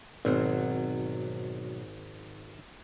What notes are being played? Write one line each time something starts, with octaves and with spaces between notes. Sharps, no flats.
G#1 B2 F#3 C4